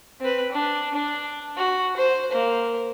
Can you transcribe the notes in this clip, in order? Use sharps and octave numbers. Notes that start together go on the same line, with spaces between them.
C4 B4
D4
D4
F#4
C5
A#3 C5